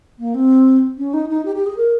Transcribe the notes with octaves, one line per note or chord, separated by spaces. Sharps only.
A#3
C4
C#4
D#4
D#4
G4
G4
G#4
A#4